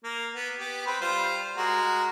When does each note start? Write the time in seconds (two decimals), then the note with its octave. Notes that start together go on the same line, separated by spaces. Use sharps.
0.04 A#3
0.35 B3
0.58 B3 G4
0.86 C4 B4
1.01 G3 F4 C5
1.57 G#3 F#4 A#4